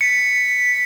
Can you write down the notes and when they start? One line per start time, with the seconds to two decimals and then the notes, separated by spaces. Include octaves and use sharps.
0.01 B6 C#7